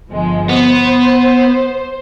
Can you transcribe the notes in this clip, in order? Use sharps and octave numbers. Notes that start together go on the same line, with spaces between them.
G1 F3 G#3
B3 C5